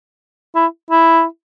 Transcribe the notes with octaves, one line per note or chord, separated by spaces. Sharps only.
E4
E4